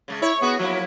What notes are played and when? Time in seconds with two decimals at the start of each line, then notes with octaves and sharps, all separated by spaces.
0.08 C#3 G#3
0.22 E4 C#5
0.42 B3 F#4 G#4
0.59 F3 F#3 A#3 E4